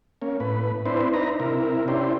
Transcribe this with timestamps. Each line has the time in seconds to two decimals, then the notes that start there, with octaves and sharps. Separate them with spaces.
0.22 A#3 C#4
0.40 A2 B4
0.86 C4 D4 E4 B4 C5
1.13 D4 D#4 B4 A#5
1.40 C3 E4 A#4
1.88 C#4 D4 E4 G4 C5